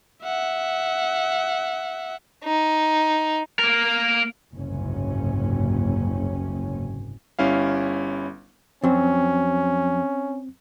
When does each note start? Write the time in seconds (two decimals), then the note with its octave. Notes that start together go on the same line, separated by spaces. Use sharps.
0.23 E5 F#5
2.44 D#4
3.59 A#3 A#4
4.52 F#1 C2 G#2 C#4
7.39 G1 G3 C#4 E4 F5
8.84 F2 F#3 C4 C#4